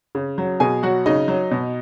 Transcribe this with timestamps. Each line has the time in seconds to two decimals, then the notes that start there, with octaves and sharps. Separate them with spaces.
0.15 C#3
0.38 F#3
0.60 B2 G#4 G#5
0.83 F#3 F#4 F#5
1.06 C#3 D#4 D#5
1.28 F#3
1.51 B2